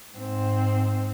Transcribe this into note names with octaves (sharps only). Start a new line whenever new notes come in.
G#2 C4